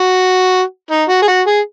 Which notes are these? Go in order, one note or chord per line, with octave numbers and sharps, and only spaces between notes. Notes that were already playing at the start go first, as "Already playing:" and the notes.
Already playing: F#4
D#4
F#4
G#4
F#4
G#4